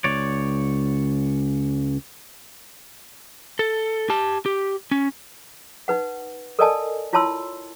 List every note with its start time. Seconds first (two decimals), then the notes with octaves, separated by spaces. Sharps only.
0.04 C#2 C#5 D5
3.59 A4
4.10 G4 A5
4.46 G4
4.91 C#4
5.88 D#4 B4 F#5
6.59 A4 A#4 D5 D#5 G#5 A5
7.13 E4 F4 C#5 A5 C6 E6